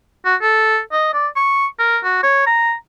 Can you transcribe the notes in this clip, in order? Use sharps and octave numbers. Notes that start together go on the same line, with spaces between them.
F#4
A4
D#5
D5
C#6
A#4
F#4
C#5
A#5